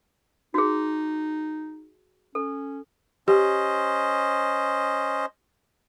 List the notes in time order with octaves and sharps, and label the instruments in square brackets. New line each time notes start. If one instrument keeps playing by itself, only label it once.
[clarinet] D#4 [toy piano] F#4 G#4
[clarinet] C#4 [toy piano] A4
[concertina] C#4 C5 D#5 [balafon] G4